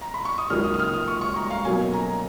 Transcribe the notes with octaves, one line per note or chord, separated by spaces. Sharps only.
A#5
B5
C#6
D#6
C#2 C#3 F#3 A#3 D#4 F6
D#6
D#6
F6
D#6
C#6
C#6
A#5
F5
B1 B2 F#3 A#3 C#4 G#5
A#5